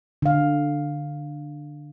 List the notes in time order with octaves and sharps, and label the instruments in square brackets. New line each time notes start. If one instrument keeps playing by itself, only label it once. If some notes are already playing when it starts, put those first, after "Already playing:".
[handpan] D3 F5